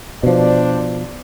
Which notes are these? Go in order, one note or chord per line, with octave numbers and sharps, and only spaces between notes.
B2 F3 D4 C5 D5